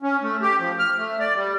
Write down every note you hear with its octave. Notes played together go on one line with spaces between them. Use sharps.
C#4
A3
G4
F3
F6
A3
D5
G3